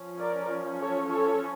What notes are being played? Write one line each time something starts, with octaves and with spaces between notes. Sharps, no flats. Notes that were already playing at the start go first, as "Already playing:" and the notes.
Already playing: F3 C#4
A#4 D5
A4 C#5
A4 C#5